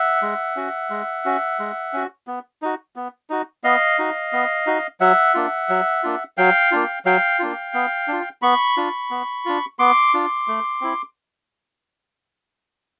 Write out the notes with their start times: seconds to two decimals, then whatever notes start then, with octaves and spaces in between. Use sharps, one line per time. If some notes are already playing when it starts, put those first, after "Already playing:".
Already playing: E5 F#5
0.22 G#3
0.56 C#4 F#4
0.90 G#3
1.25 C#4 F#4
1.60 G#3
1.93 C#4 F#4
2.27 B3
2.62 D#4 F#4
2.96 B3
3.30 D#4 F#4
3.64 B3 D#5 F5
3.99 D#4 F#4
4.33 B3
4.67 D#4 F#4
5.00 F#3 E5 F#5
5.34 A#3 D4 F4
5.69 F#3
6.03 A#3 D4 F4
6.37 F#3 F5 G5
6.72 A#3 D4 F4
7.05 F#3 F5 G5
7.39 A#3 D4 F4
7.74 B3
8.08 D4 F4
8.42 B3 B5 C#6
8.77 D4 F4
9.11 B3
9.45 D4 F4
9.79 B3 C6 D6
10.14 D4 F4
10.48 A3
10.81 C4 E4